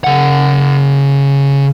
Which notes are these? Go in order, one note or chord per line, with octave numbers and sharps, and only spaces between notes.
C#3 F#5